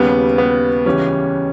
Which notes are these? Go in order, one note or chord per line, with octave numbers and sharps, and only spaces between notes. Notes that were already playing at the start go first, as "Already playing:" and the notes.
Already playing: D#2 C#3 G3 B3
B3
C#2 C#3 E3 G3 C#4